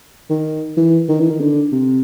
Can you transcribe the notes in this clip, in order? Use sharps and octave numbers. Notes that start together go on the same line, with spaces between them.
D#3
E3
D#3
E3
D#3
D3
C3